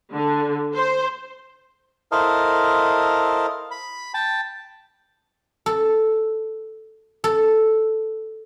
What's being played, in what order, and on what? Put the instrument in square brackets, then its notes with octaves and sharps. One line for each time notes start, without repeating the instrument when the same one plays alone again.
[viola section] D3
C5
[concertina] E4 A4 A#4 C5 D#5 F5
B5
G5 A5
[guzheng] A4
A4